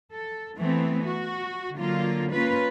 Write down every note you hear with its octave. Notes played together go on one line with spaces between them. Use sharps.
A4
E3 A3 B3 C4
F#4
D3 F#3 A#3 F4
A#3 C#4 F4 B4